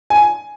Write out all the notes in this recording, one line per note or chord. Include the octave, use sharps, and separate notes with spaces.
G#5